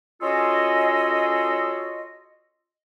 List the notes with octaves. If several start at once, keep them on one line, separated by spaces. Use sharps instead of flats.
C#4 F4 F#4 G#4 A4 D#5